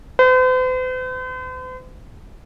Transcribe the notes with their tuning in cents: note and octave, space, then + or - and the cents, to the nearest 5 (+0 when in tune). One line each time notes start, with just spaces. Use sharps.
C5 -45